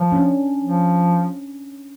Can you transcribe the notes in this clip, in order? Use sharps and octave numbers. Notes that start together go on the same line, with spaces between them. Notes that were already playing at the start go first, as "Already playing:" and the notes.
Already playing: F3
C#4
D4
F3